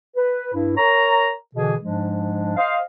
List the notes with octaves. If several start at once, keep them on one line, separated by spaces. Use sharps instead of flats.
B4
G2 E4
A#4 C#5 A#5
B2 D3 E3 G#4
G#2 F3 G#3 D4
C5 D#5 F5